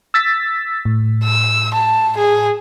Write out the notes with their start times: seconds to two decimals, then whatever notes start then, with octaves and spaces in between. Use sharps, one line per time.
0.14 E6 A6 B6
0.85 A2
1.23 E6
1.74 A5
2.18 G#4